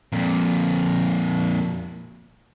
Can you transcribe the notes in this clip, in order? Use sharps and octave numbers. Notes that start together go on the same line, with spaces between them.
F2 A#2